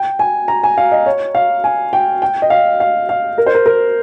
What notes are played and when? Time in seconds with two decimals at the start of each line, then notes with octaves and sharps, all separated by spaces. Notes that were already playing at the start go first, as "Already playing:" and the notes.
Already playing: G5
0.19 G#5
0.48 A#5
0.64 G#5
0.78 F5
0.92 D#5
1.06 C#5
1.35 F5
1.64 G#5
1.93 G5
2.22 G5
2.42 D#5
2.50 F5
2.80 F5
3.09 F5
3.38 A#4
3.46 C5
3.54 A#4
3.66 A#4